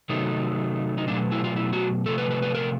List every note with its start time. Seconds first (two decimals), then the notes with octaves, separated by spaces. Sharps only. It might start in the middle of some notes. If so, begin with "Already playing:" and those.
0.09 C3 D#3 F#3 A3 D#4
0.98 D#4
1.08 B2 F#3 A3 D4
1.32 E4
1.44 F4
1.56 E4
1.73 F#4
2.06 C3 F3 A3 A4
2.18 B4
2.30 B4
2.42 B4
2.55 A#4